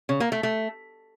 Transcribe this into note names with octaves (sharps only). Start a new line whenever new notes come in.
C#3
A#3
A3
A3